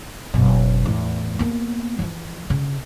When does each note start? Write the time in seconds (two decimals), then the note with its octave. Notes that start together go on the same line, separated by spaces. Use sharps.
0.34 F#1 B2
0.86 E2 A2
1.39 A#3 B3
1.99 E3 F3
2.50 C#3